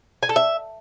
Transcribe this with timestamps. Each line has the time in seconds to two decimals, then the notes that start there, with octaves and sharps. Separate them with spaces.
0.23 G#5
0.29 A4
0.36 E5